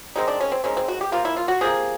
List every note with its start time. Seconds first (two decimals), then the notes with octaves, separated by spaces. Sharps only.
0.16 D#3 G#3 C4 D#4
0.28 D4
0.41 C#4
0.52 C4
0.64 D#3 G#3 C4 C#4
0.77 C4
0.88 F#4
1.01 G4
1.12 C3 F3 A#3 F4
1.25 E4
1.37 F4
1.48 F#4
1.61 C3 F3 A#3 G#4